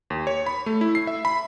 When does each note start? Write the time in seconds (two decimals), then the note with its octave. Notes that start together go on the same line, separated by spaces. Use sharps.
0.10 D#2
0.27 C#5
0.46 B5
0.66 A3
0.81 E4
0.95 C7
1.07 E5
1.25 B5